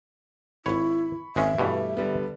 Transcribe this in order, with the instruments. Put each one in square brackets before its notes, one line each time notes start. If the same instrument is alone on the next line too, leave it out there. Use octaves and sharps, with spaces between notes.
[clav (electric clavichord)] G#1 C#5 [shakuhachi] E4 [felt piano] B5 C#6
[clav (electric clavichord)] G#1 G#3 C#4 [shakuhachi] E5
[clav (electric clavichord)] G2 B2 E3 [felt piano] G3 A3
[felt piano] D3 G3 B3